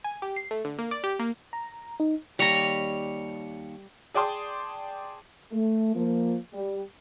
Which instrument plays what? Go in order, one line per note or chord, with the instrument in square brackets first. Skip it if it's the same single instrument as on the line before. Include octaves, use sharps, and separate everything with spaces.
[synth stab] G#5
G4
C7
A3
D3
A#3
D5
G4
A#3
[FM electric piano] A#5
D#4
[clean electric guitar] D#2 C#5 [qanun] G3 A#5
[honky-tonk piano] G#4 D5 G5 A5 C6 D#6
[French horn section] A3
F3 A#3
G3